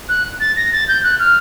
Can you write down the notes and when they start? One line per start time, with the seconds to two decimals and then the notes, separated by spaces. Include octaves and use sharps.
0.09 F#6
0.40 A6
0.56 A#6
0.72 A6
0.88 G6
1.04 F#6
1.19 F6